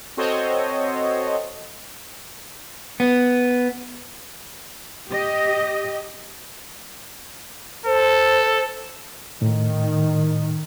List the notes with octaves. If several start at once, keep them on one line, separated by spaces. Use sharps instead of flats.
C4 F#4 A4 C5 C#5 D#5
B3
G4 D#5
A4 C5
A2 D#3